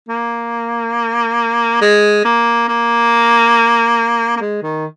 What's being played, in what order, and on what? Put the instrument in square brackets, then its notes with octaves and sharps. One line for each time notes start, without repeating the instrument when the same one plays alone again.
[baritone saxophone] A#3
G#3
A#3
A#3
A#3
G#3
D#3